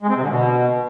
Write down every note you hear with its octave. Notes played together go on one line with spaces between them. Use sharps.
G#3
C4
C3
D3
B2